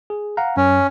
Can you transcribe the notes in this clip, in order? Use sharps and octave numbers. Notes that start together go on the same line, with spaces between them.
G#4
F5 F#5 A#5
F#2 C#4